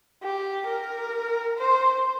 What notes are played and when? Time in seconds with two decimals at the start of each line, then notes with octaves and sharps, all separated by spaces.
0.23 G4
0.67 A#4
1.57 C5